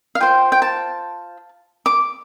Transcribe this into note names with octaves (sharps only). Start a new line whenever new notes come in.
F5
F4 C5 G5
G5
A5
D6